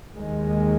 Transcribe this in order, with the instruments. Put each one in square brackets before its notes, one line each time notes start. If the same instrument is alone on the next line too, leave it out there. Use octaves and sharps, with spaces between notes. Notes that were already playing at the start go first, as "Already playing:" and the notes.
[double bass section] D#2 D#3 G#3